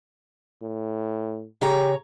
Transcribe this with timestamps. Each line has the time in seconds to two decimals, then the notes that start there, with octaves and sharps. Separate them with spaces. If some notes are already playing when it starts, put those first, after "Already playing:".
0.62 A2
1.61 C#3 G4 C#5 A#5